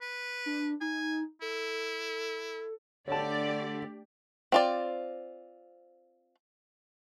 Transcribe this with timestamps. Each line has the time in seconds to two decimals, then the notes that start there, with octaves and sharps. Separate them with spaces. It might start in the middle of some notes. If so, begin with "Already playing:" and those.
0.01 B4
0.46 D4
0.81 D#4 G#5
1.42 E4 A4
3.08 D3 A3 D4 G4 C#5 D5 A5
4.52 C4 F4 D5